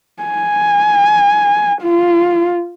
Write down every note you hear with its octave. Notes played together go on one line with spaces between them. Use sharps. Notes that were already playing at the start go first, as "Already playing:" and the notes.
G#5
F4